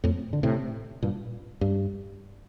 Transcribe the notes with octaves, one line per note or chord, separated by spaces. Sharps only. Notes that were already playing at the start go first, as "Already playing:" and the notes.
F2 A2
D3
A2 C3
G2 A#2
G2